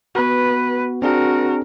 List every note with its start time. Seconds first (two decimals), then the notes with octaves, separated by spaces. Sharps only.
0.15 B3 F#4 B4
1.02 C4 D4 F#4 G#4 A#4